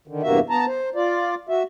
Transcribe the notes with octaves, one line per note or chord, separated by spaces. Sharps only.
D3 D#3
E2 G2 C3 A#3 F#4 E5
B3 A5 A#5
C5
F4 D5
F#4 E5